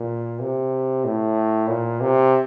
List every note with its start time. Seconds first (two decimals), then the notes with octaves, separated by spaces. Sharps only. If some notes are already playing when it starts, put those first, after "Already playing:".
Already playing: A#2
0.40 C3
1.05 A2
1.68 A#2
2.01 C3